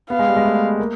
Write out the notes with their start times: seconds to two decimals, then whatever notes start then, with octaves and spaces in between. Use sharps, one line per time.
0.10 B3 F5
0.19 G#3
0.28 G3
0.36 G#3
0.45 A3
0.79 A#3